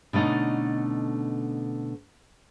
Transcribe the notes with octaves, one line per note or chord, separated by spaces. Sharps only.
B2 D3 A3 C#4 D#4